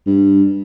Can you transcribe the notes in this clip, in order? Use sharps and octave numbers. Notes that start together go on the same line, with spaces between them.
G2